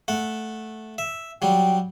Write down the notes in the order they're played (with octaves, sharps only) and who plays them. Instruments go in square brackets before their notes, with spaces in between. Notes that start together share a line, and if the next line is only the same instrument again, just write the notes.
[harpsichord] A3 F#5
E5
[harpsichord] F#3 G3 [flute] G5